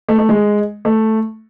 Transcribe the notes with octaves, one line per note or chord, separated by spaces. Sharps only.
A3
A3
G#3
A3